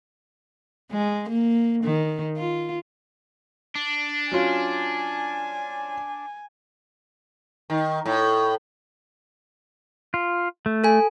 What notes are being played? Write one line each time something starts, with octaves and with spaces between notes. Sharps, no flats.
G#3
A#3
D#3
F4
D4
F#3 C#4 F4 G#5
D#3
A2
F4
A3
A4 G#5